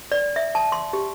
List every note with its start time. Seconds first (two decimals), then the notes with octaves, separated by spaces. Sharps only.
0.12 D5
0.36 E5
0.55 A5
0.72 C6
0.93 G4